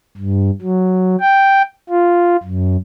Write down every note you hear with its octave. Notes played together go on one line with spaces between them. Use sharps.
G2
F#3
G5
F4
F#2